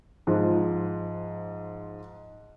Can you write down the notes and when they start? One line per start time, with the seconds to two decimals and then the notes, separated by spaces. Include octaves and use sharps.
0.27 G#2 F3